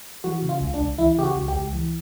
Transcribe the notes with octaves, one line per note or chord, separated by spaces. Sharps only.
E3 F#4
C#3
F4
C#2
D4
C#2
E3 E4
C#3 G4
F#4
C#2
G4
C#2
E3